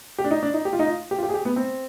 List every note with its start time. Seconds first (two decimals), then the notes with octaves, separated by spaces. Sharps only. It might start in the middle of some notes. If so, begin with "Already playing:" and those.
0.18 G4
0.24 D4
0.31 D#4
0.43 D4
0.54 D#4
0.65 G4
0.73 F4
0.79 D#4
0.87 F4
1.11 G4
1.18 F4
1.23 G4
1.29 G#4
1.34 G4
1.45 B3
1.56 C4